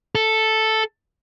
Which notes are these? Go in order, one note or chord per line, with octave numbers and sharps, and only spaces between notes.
A4